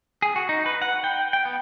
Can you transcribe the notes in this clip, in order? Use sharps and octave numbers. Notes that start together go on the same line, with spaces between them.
G#4
F#4
D#4
B4
F#5
G5
G5
B3